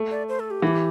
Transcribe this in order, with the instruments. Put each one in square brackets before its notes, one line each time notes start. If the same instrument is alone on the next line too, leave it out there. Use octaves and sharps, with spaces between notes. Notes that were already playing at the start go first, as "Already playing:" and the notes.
Already playing: [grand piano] A3
[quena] D5
C5
A4
G4
[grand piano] E3